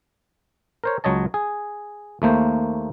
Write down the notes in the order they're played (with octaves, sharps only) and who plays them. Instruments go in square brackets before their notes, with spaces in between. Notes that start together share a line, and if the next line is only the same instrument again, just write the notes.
[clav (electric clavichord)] A#4 C5 C#5
C#2 F#3 C#5 D#5 A5
G#4
D#2 A3 A#3 C5